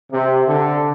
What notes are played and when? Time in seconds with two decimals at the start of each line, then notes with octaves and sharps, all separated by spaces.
0.11 C3
0.46 D3